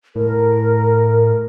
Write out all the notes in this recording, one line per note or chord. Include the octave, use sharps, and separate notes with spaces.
A2 A#4